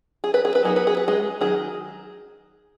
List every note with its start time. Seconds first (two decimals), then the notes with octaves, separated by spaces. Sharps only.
0.24 G#4
0.34 B4
0.45 G#4
0.55 B4
0.63 F#3 B3 D#4 G#4
0.76 B4
0.87 G#4
0.97 B4
1.08 G#3 G#4
1.41 D#3 F#3 G#4